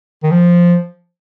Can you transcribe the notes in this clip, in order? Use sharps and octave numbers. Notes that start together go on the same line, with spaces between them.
D#3
F3